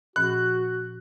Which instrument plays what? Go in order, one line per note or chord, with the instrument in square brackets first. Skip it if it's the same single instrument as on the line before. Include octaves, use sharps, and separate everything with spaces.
[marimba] A#2 F3 C#4 [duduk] F#4 [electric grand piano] F#6